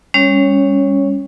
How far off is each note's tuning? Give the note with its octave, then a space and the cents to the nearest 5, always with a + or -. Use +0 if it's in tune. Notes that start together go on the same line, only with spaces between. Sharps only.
G3 +35 C#4 +0 C#5 +0